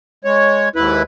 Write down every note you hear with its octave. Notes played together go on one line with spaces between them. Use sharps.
G#3 C#5
D#2 G#2 E4 B4 B5